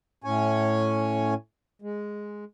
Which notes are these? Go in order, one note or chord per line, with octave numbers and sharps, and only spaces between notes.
A2 C#4 C#5 G#5
G#3